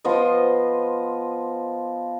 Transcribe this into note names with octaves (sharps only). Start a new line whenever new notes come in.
F3 B3 C5 D#5